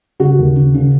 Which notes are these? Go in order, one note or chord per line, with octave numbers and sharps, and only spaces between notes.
C#3 F#4
D#2
C#3
C#3